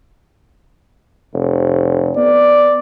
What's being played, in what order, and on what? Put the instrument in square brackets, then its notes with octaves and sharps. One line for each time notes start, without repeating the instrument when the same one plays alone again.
[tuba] F1
[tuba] B3 [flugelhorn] D5